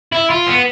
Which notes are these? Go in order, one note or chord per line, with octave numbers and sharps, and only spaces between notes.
E4
F4
B3